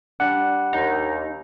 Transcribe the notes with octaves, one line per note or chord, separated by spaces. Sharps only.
G3 D4 F#5
D#2 D#4